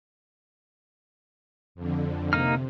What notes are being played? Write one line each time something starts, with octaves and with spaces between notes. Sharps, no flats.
F2 D3
C3 A#3 D#4 F6